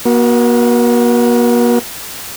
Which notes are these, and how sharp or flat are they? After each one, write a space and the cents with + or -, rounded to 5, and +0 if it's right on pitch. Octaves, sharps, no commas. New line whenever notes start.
A#3 +40 F#4 +0